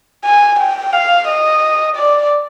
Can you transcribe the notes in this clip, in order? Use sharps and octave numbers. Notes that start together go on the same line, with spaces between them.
G#5
G5
F5
D#5
D5